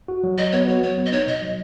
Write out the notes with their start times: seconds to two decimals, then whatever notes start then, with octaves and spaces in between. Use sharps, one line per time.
0.08 F#4
0.24 F#3
0.38 F#3 D#5
0.52 B3 C#5
0.68 F#4 C#5
0.83 F#3 C#5
0.98 B3
1.06 D#5
1.12 D#4 C#5
1.27 B2 D#5
1.42 F#3